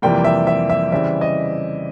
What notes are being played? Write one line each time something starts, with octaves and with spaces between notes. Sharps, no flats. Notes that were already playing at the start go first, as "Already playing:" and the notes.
F2 C3 E3 G3 A#3 G5
E5
E5
E5
C#3 E3 G3 C4 E5
D#5